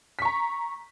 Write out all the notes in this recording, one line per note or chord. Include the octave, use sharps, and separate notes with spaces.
A#5 C#6 B6